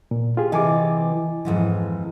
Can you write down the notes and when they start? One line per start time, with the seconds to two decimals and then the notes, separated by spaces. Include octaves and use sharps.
0.11 A#2
0.37 F4 G4 G#4
0.52 C3 E3 A4 D#5 G#5 D6
1.45 F2 G#2 E3